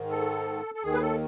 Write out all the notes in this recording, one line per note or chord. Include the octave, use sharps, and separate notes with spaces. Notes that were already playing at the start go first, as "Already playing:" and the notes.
Already playing: G#2 D#3
A4
A4
D#2 D#3 G#4
B4
A4